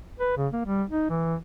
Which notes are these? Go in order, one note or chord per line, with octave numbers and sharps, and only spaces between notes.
B4
C#3
A#3
G3
D#4
E3